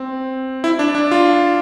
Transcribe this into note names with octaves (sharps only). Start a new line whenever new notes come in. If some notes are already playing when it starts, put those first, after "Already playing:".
Already playing: C4
E4
D4
D4
F4